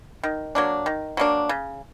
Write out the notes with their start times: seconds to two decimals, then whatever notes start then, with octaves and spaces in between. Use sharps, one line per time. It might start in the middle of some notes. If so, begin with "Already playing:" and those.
0.24 D#3
0.55 F#3 A#3 D4
0.86 D#3
1.17 F#3 A#3 D4
1.49 C#3